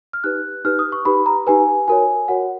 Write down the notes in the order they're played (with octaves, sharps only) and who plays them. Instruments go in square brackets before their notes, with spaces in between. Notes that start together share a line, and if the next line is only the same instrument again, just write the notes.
[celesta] F6
D#4 G4 B4 F#6
D#4 G4 B4 F6
D#6
C#6
D#4 G4 B4 B5
A#5
D#4 G4 B4 G#5
F#4 A#4 C#5 G#5
F#4 A#4 C#5 F#5